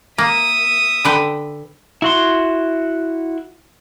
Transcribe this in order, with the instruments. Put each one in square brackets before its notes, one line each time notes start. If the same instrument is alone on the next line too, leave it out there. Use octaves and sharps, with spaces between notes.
[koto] A#3 [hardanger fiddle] E5 D#6
[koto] D3 B4 G5
[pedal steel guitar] E4 F#4 C6